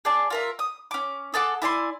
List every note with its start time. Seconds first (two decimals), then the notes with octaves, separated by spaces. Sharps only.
0.05 G#4 D5 A5
0.30 F4 A#4 E5
0.59 D#6
0.91 C#4 D6
1.34 G#4 A4 F#5 D6
1.62 E4 D5 G#5 C6